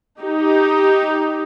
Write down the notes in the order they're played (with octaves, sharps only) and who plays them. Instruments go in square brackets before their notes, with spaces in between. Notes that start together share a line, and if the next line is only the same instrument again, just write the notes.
[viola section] D#4 G4